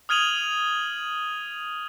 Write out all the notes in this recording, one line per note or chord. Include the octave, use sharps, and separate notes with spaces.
D#6 F6 G#6 D#7 F7 F#7